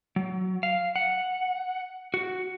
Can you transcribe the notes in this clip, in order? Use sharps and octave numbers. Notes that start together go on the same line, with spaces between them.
F#3
F5
F#5
F#4